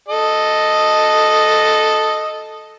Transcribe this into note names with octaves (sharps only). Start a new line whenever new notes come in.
A4 D#5